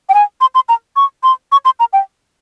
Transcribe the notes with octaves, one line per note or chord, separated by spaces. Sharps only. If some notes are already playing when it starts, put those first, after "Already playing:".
G5
G#5
C6
C6
A#5
C#6
C6
C#6
C6
A#5
G5